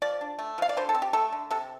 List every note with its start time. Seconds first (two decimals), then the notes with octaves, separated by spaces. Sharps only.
0.02 F3 D5
0.21 D4
0.39 A3
0.58 F3 F5
0.69 D5
0.77 D3 C5
0.89 A4
0.94 C4
1.02 G4
1.13 A3 A4
1.32 D3
1.51 C3 A4